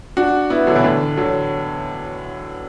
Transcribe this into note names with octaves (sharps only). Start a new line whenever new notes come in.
D4 F#4
B3 E4
D3 F#3
B2 E3
A2 D3
D3 F#3